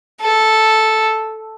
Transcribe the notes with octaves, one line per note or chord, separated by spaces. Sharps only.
A4